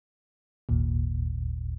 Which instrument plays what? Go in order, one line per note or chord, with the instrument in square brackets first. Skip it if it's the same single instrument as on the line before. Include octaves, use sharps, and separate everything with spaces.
[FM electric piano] G#1 D#2 A#2